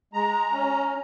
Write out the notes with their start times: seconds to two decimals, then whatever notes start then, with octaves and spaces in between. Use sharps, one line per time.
0.13 G#3 A#5
0.53 C#4